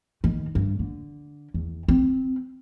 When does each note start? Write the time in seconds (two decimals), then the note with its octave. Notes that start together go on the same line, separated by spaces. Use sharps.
0.24 D#3
0.55 G2
0.79 D3
1.54 E2
1.88 C4